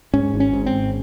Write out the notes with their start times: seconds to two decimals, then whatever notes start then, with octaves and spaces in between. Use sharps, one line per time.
0.13 G#2 C#4
0.34 G#1
0.40 C#4
0.53 G#2
0.66 C4
0.73 G#1